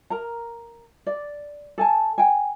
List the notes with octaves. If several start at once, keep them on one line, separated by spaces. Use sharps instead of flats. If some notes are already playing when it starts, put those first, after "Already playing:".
A#4 A#5
D5
A4 G#5 A5
G5 G#5